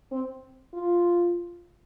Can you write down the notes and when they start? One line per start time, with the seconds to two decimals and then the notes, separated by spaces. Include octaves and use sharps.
0.12 C4
0.74 F4